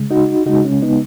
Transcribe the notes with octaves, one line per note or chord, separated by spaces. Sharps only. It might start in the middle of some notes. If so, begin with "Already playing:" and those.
Already playing: C#3 G#3
D#4 F#4
C#3 G#3 D#4 F#4
C#4
B3 D#4